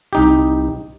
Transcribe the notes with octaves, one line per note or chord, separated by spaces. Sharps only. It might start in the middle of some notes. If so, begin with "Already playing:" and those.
C2 D#4 G4